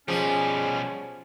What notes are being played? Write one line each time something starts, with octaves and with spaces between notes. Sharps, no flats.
B2 F3 G3 C#4 G#4